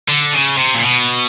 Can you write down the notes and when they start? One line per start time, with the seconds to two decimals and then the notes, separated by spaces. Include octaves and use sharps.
0.08 D3
0.34 C#3
0.58 C3
0.75 A#2
0.83 B2